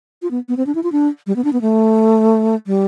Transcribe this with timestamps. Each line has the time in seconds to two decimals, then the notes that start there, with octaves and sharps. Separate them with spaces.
0.22 F4
0.31 B3
0.49 B3
0.57 C4
0.66 D4
0.75 E4
0.83 F4
0.92 D4
1.27 G3
1.36 B3
1.44 D4
1.53 B3
1.61 A3
2.67 G3